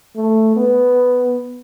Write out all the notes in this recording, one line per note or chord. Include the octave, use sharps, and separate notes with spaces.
A3
B3